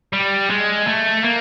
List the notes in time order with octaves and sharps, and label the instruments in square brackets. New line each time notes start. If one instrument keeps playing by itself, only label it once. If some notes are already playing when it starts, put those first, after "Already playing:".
[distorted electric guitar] G3
G#3
A3
A#3